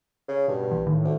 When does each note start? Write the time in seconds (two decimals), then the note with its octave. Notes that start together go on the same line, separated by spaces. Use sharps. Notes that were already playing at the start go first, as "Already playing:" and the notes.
0.28 C#3
0.48 G2 B2
0.71 A#1 E3
0.87 A2 D#3
1.04 D2